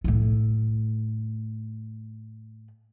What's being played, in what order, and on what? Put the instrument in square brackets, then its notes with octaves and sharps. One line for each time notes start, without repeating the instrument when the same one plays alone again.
[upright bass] A2 A3